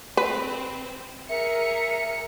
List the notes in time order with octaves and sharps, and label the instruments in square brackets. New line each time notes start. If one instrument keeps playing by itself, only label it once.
[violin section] C4 [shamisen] B4
[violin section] G#4 A#5 C#7 [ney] A#4 [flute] E5